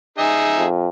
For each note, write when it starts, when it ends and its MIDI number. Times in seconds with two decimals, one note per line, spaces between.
0.18 0.64 63
0.18 0.64 68
0.18 0.64 76
0.58 0.89 41